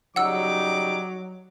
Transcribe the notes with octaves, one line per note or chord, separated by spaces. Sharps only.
C#3 F#3 G3 D#4 F#5 D6 E6